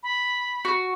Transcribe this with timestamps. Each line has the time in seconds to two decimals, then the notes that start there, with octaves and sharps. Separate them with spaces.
0.03 B5
0.65 F#4